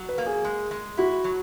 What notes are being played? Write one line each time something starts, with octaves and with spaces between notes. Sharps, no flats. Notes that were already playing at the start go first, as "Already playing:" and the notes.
Already playing: F#3
B4
A#3
G#4
G#3
G#3
E4 F#4
F#3